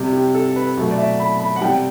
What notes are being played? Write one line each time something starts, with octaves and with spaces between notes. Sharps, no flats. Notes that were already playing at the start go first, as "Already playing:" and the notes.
Already playing: C3 G3
G4
A4
B4
B2 F#3 A3
D5
E5
B5
B5
F#5
C3 G3 G5